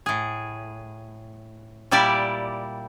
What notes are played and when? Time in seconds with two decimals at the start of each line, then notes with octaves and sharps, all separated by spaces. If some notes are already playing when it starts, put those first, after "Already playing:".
0.06 A2 G#4
1.91 A#2 G3 E4 G4 D5